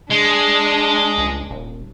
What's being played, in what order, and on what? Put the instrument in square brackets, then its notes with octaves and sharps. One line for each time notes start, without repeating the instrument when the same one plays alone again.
[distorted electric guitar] G#3 [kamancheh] D4
[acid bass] C#2
D#1